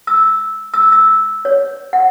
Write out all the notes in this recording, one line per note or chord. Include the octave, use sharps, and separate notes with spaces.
E6
E6
E6
C#5
F#5